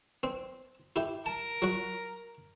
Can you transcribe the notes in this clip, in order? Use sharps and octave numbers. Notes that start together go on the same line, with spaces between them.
C4
E4 G4
A#4 A5
F#3 F#4